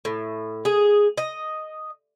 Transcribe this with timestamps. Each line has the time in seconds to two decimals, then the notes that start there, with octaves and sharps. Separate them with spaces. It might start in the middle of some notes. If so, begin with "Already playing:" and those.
0.05 A2
0.65 G#4
1.17 D#5